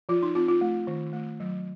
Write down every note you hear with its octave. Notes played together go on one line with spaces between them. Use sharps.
F3 F4
D#4
C4 F4
F4
A3
D#3
A3
F#3